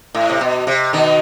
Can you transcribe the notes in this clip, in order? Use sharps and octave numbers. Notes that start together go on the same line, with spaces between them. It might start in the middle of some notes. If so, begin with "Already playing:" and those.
A2
C3
B2
C3
B2 D#3